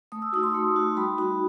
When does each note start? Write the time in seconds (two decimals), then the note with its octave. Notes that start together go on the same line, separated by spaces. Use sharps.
0.12 A3 D#6
0.22 E6
0.33 D#4 F#4 D#6
0.43 C6
0.54 A3
0.76 D#4 F#4
0.97 G3 B5
1.18 D#4 F#4